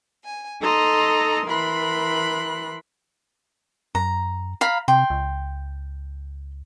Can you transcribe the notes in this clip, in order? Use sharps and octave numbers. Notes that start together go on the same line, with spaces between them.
G#5
D#4 A4 D#5 A#5 C6
E3 A#4 B5 C6 F#6
F#2 A#5
F5 A#5 B5
C3 G5 C6
C#2